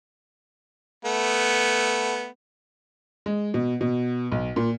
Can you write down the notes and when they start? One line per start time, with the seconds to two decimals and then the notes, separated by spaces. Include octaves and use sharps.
1.05 A3 B3
3.26 G#3
3.54 B2
3.81 B2
4.32 B1
4.56 A#2